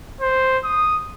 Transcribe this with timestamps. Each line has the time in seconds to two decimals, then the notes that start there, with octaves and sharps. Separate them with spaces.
0.21 C5
0.64 D#6